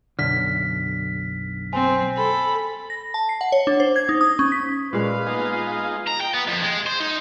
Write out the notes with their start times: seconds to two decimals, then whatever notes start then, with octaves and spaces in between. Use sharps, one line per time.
0.19 B1 F#2 D3 F6 B6
1.73 C4 G#5
2.16 A4 B5
2.90 A#6
3.14 A5
3.29 C7
3.41 F#5
3.52 C#5
3.67 D4
3.80 C5
3.96 G#6
4.09 D#4
4.21 D#6
4.39 C#4
4.52 B6
4.93 A#2 G#3 B4 F5
5.26 G#3 B3 D#4 F4
6.07 A#5
6.21 G5
6.34 B3
6.48 F2
6.62 G#3
6.86 C5
7.00 D#4